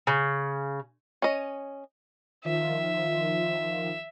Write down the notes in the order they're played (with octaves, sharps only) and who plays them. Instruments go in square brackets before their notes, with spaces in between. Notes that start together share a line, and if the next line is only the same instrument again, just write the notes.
[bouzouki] C#3
[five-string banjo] C#4 D#5
[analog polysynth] D#3 F3 F4 [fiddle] E5